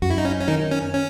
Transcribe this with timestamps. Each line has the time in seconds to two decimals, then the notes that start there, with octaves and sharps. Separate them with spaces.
0.02 F#2 F#4
0.10 E4
0.18 D#4
0.25 C#4
0.40 C#4
0.48 D#3 D#4
0.71 C#4
0.94 C#4